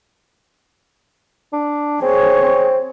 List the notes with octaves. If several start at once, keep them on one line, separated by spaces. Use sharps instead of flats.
D4
C4 G#4 C#5
C4